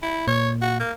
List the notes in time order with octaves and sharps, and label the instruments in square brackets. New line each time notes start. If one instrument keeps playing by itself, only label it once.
[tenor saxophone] E4
[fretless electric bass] A#2 [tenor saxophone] C#5
[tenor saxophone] F#4
A#3